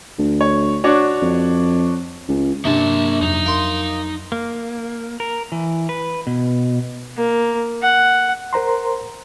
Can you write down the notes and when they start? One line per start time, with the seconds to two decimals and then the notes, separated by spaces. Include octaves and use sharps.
0.19 D2
0.41 C#5
0.84 D4 F#4 C#5
1.22 F2
2.28 C#2
2.65 G2 C3 A#3 D4 A5
3.22 F2 F#3 D#4 A#5
3.46 A#3 C6
4.32 A#3
5.20 A#4
5.52 E3
5.89 B4
6.27 B2
7.17 A#3
7.82 F#5
8.53 A#4 C5 A#5 C6